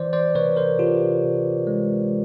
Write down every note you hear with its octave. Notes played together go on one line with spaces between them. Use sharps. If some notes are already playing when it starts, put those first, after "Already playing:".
Already playing: E3 C5 D5
C5 D5
C3 B4 C#5
A#4 C5
C3 F4 G4
C3
G#3